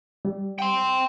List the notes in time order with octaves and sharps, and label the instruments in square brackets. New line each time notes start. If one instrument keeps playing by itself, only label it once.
[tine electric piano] G3
[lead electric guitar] G5 C6